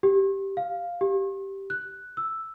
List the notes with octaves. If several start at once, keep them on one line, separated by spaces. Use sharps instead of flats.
G4
F5
G4
F#6
E6